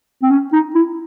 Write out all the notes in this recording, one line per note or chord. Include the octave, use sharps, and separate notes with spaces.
C4
C#4
D#4
E4